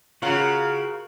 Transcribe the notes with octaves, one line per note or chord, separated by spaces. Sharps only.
C#3 F4 F#4 A#4 F#5